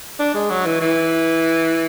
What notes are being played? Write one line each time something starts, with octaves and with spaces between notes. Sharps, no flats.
D4
G#3
F#3
E3
E3